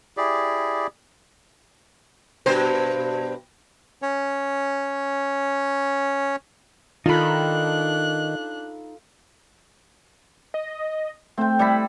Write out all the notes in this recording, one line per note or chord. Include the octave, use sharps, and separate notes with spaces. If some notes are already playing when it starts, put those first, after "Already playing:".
E4 G4 G#4 D5
G2 B2 C5
C#4 C#5
D#3 D4 D#4 F4 A4 B5 F#6
D#5
A3 C4 G5
G3 E4 B5